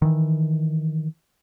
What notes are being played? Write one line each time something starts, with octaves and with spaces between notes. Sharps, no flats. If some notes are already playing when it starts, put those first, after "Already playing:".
D#3 E3